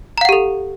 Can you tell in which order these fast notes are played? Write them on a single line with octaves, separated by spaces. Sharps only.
A#5 F5 F#5 G4 A4